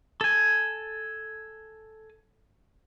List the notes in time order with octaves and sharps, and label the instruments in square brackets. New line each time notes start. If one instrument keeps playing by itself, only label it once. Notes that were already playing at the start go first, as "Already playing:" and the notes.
[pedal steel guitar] A4 G#5